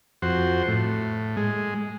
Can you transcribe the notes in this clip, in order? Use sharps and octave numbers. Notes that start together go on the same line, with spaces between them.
F2 F#4 C5
A2
G#3